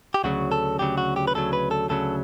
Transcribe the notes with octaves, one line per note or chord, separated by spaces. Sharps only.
G4
D2 C#3 F#3 F#4
A4
D2 C#3 F#3 G4
F#4
G4
B4
D2 C#3 F#3 A4
B4
A4
D2 C#3 F#3 A4